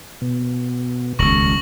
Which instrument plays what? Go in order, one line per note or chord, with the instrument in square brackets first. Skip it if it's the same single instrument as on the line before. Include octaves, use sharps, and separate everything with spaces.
[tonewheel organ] B2
[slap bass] D#1 C#2 [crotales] C#6 A#6 F#7